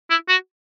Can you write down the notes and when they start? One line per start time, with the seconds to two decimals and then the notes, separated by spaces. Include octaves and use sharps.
0.10 E4
0.29 F#4